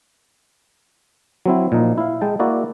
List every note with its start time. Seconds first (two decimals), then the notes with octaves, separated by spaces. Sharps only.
1.46 F#3 C4 E4
1.72 A#2 F3 D#4
1.98 E4 F5
2.21 G#3 G5 A5
2.39 A#3 E4 F#4 D5